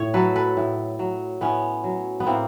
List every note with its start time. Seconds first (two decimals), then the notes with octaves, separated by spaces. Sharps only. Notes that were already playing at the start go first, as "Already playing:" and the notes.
Already playing: A2 C#5
0.14 F#3 A4 B4
0.36 A4 B4
0.57 A2
0.99 F#3
1.41 A2 B3 C#4
1.84 F#3
2.20 B3
2.27 A2 A#3 C4